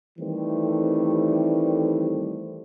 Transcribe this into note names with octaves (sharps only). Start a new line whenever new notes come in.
D#3 E3 G3 A3 C4